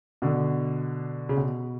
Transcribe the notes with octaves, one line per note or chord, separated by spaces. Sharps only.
B2 D3
C#3
B2